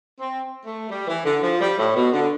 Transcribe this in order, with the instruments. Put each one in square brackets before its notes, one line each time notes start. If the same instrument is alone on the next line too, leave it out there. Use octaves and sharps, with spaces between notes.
[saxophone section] C4
A3
G3
E3
D3
F3
G3
A2
B2
D3